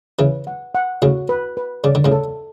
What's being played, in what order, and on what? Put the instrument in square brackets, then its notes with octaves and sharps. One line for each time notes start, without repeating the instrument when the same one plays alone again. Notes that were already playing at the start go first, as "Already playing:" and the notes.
[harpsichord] C#3 E3 [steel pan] B4
[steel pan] F#5
F#5
[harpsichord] A2 C#3 [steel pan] F#4
[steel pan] B4
B4
[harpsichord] C#3 [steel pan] D5
[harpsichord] D3
A2 C#3
[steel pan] A4